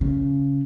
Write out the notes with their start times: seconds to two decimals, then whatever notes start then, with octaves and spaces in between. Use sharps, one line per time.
0.01 C#3